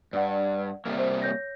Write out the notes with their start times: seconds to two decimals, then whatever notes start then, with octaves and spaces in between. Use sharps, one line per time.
0.13 G2 D5 F#5
0.85 C3 G3 A#3
0.98 C5
1.22 C#5 G6 A#6